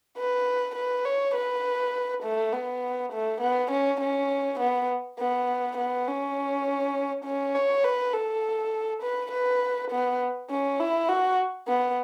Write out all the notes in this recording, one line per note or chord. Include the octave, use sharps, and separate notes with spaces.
B4
B4
C#5
B4
A3
B3
A3
B3
C#4
C#4
B3
B3
B3
C#4
C#4
C#5
B4
A4
B4
B4
B3
C#4
E4
F#4
B3